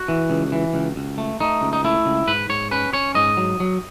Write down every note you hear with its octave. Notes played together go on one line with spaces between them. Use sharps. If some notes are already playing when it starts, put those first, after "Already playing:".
Already playing: F#4
E3
C#2
E3
C#2
C#2
A3
A3 D#4
C#2
D#4
A3 E4
C#2
G#2 B4
G#2 C#5
C#4 B4
C#4 C#5
G#2 D#5
F#3
F#3